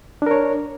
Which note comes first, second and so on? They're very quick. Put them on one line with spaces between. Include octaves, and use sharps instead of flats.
D4 A#4 C#5